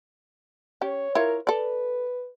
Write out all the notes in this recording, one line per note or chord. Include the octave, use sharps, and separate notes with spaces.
C#4 G4 C#5
E4 F4 A#4 C#5
A4 B4 D5